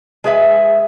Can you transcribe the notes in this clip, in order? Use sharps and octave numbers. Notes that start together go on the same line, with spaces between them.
G#3 G#4 B4 D5 E5 G#5